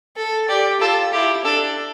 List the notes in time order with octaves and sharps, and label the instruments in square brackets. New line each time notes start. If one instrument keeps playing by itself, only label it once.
[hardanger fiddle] A4
[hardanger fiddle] G4 [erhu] D5
[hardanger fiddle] F4 [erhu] A4
[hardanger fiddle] E4 [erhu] G4
[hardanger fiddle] D4 [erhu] A4